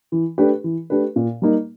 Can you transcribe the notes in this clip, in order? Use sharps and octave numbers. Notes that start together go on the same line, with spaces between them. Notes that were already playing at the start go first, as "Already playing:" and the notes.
E3
A3 D4 G4 B4
E3
A3 D4 G4 B4
A#2
G3 A#3 D#4